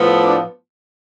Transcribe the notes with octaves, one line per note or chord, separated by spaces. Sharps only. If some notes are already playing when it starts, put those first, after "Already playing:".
Already playing: A2 F3 B3
D4